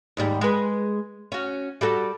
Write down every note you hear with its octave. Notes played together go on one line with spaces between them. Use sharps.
D#2 G#2 G3
G#3 B4
C#4 F#4
G3 F#4 A4